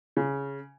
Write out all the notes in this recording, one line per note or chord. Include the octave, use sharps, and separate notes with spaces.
C#3